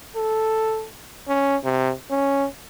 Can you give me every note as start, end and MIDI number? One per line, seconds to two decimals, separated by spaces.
0.16 0.86 69
1.28 1.57 61
1.64 1.92 48
2.11 2.46 61